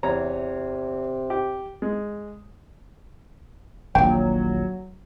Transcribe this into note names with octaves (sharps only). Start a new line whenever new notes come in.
E2 C3 C#5 A#5
G4
G#3
D#1 A#1 F#3 G5